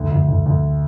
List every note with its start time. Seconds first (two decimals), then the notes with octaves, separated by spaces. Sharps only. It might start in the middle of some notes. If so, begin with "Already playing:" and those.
Already playing: D2
0.11 D2
0.29 D2
0.46 D2